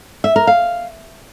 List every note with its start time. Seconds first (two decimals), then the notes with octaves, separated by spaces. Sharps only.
0.24 E5
0.36 A#4
0.47 F5